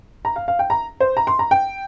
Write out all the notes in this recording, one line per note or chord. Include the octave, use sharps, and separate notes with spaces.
A#5
F5
F5
G5
A#5
C5
A#5
C6
A#5
G5